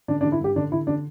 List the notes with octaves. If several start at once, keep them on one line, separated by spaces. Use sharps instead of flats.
D3 D4
D4
D3
E4
G2 G4
D3 D4
D3 E4
D3 D4